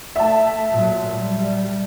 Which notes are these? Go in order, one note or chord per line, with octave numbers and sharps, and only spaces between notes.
A3 E5 A5
A#2 F#3
G3